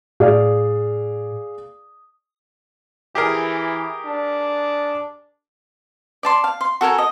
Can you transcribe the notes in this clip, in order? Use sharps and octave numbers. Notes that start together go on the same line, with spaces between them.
A2 G#4 D5 F5
E3 G4 G#4 A#4
D4
D5 A5 C6
F5
C6
F#4 A4 A#4 G#5
D#5